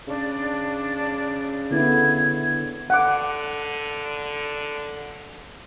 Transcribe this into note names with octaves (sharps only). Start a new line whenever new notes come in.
C#3 D4
D3 B3 E4 G#6
D3 F#5 D6